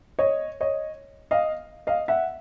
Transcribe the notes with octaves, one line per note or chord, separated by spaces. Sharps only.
C#5 D#5
C#5 D#5
D#5 F5
D#5 F5
E5 F#5